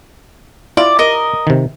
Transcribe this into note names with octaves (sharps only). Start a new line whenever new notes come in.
E4 F4 D5
A#4 D#5
C3 D#3